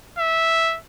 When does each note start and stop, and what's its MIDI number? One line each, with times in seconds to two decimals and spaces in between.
0.18 0.78 76